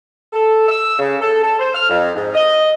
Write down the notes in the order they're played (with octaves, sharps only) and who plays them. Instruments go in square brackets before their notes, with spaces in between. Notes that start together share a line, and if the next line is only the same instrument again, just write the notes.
[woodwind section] A4
E6
C#3
A4
A4
C5
F6
F2
G#2
D#5